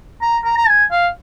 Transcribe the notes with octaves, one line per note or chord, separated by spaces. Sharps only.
A#5
A#5
A#5
G#5
F5